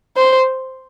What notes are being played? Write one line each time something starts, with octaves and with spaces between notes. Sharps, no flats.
C5